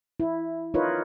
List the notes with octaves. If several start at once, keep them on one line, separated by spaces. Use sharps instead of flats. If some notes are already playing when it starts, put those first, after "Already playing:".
E4
D#4 F4 A#4 B4 C#5